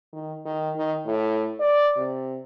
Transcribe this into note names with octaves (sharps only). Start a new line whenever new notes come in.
D#3
D#3
D#3
A2
D5
C3